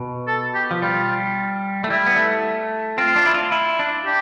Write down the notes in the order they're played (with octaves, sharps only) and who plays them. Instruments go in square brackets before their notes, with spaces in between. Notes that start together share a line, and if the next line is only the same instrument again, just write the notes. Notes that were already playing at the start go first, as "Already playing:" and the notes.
Already playing: [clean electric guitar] B2
[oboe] A4
G4
[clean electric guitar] F3
[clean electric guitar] G3 [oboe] F4
[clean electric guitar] A3
[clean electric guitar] G3 [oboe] E4
[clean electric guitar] B3
A3
[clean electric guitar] C4 [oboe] F4
[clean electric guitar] D4
E4
F4
E4
D4
[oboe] G4